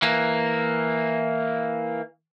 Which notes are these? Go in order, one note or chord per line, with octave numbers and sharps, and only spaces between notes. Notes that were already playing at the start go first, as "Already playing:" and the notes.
E3 A#3